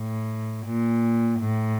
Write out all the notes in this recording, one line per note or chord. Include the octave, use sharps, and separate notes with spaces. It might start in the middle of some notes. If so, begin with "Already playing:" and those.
Already playing: A2
A#2
A2